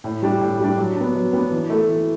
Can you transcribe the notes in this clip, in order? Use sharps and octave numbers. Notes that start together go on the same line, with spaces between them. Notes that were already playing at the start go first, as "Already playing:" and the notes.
A2
G3 D4
A2
G3 D4
F#3
B3 D4
F#3
B3 D4
E3
A3 E4 A4
E3